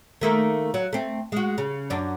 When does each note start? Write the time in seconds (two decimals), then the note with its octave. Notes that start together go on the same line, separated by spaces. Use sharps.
0.21 D#3 A3 A#3
0.74 F#3
0.93 A3 C4
1.32 G#3 F#4
1.58 C#3
1.90 F#2 D4